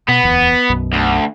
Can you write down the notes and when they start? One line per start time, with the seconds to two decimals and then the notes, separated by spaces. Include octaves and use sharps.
0.08 B2 B3
0.23 D1 E2
0.70 B1 F#2 B2
0.93 D2